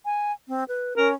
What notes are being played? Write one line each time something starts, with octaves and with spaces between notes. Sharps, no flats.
G#5
C4
B4
C#4 A#4